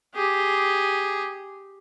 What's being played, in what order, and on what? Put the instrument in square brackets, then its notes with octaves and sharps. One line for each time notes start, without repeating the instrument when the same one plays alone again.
[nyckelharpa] G4 G#4